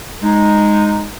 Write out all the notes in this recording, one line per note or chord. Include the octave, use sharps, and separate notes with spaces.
G#3 D#4